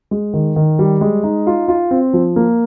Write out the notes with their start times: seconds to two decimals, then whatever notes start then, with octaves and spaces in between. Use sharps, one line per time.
0.11 G#3
0.34 D#3
0.56 D#3
0.79 G3
1.01 G#3
1.24 D#4
1.47 F4
1.68 F4
1.91 C4
2.13 F3
2.36 A#3